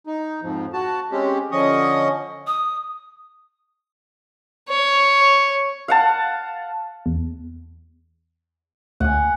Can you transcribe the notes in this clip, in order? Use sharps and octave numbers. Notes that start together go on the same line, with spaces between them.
D#4
F2 G#2 F3
F#4 A5
G#3 C4 C#4 G4
D3 F3 C#4 D#5 C#6 D#6
D#6
C#5
F5 F#5 A5
E2
D2 F#5 G#5